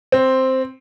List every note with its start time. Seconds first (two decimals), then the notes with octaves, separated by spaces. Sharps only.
0.12 C4